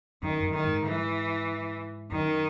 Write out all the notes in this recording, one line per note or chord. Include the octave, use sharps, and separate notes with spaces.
F#2 D#3
F#2
D#3
G#2
E3
F#2 D#3